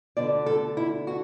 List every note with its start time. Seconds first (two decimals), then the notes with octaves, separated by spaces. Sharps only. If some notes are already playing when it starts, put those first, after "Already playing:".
0.17 D2 D3 B3 D4 D5
0.46 A4
0.77 E4
1.07 F#4